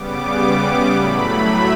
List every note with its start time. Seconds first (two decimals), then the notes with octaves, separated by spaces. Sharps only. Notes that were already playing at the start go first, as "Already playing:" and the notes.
Already playing: C#3 G3 B3 D6
0.93 A2 F#3 A3 B5
1.44 E5